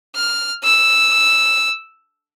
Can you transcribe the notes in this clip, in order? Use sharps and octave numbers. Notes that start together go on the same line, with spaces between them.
F6
E6